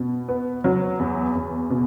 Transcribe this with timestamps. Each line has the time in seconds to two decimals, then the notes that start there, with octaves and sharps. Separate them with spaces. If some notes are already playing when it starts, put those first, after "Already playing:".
Already playing: B2
0.28 B3
0.64 F#3
1.00 E2
1.35 E2
1.70 B2